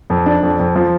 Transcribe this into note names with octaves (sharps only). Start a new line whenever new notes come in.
F2
D4
F2
F2
F3